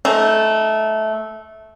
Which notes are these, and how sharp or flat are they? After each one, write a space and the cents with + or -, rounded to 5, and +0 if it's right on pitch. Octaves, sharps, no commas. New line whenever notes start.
A3 -15 D#4 +0